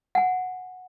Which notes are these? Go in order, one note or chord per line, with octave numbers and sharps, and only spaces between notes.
F#5 G#5